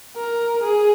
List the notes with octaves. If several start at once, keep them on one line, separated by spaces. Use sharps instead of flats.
A#4
G#4